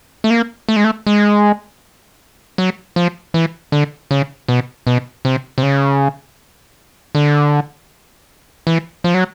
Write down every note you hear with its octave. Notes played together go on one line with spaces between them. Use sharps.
A3
A#3
A3
G#3
A3
G#3
F#3
F3
E3
D3
C#3
B2
B2
C3
C3
C#3
D3
E3
F3
F#3